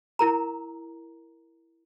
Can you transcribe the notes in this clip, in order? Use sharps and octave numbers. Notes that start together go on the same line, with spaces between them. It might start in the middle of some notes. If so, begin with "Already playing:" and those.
E4 A#4 A#5